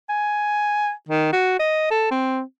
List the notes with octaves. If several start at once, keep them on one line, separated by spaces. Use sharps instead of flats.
G#5
D#3
F#4
D#5
A4
C4